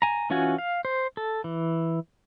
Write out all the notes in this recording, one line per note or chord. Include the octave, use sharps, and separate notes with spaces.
G#5 A#5
E3 C#4 F4 F#4 G#5
F5
C5
A4
E3